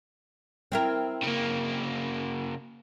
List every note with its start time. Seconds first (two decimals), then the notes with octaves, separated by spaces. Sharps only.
0.72 C4 E4 A#4
1.23 C#3 A#3